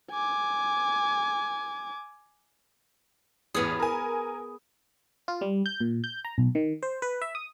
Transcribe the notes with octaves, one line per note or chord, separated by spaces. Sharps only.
G#5 D6
A1 E2 B3 G#4
A#4 G#5
F4
G3
G6
A#2
G6
A#5
B1
D#3
C5
B4
E5
D#6